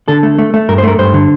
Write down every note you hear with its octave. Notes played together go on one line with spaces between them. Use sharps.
D3 A4
A3
A3
A3
G2 A#4
C5
A3 A#4
G2 C5
D3